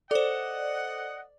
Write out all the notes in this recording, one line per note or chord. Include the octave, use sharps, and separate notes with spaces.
A4 C5 D5 D#5 F#5